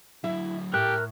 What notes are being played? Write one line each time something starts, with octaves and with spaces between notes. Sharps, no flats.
D3 F#3 E4 E5
A2 G4 A4 A#4 E5 F#6